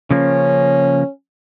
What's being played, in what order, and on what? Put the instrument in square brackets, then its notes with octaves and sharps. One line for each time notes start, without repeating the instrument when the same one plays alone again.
[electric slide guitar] C#3 F3 A#3 [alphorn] C#4